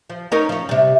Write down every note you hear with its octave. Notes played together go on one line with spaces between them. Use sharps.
F3
C#4 D#4 A#4
F3 C#4
C3 G3